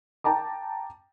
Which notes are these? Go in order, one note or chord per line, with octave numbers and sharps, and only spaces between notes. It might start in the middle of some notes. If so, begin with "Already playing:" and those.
G5 A5 A#5 D6